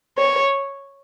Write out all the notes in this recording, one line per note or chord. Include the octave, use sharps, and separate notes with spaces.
C#5